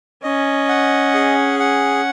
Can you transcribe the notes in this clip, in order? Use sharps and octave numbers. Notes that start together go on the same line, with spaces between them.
C#4 D#5
F#5
G#4
F#5